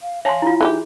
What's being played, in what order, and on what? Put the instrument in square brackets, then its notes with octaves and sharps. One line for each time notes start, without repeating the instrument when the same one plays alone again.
[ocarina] F5
[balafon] C#5 G#5 A5 [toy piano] E5 C6 [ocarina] F5
[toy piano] E4 F4
[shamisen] E3 F4 G4 [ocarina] D#4 [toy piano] G#4